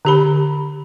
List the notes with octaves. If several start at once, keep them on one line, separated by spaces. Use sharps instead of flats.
D3 G4 B5